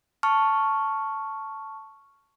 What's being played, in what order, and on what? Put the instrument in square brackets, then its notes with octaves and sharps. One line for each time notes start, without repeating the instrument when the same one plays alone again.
[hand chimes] A5 C#6 F6